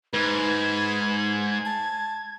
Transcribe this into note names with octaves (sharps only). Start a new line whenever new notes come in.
G#2 B4 G#6
A5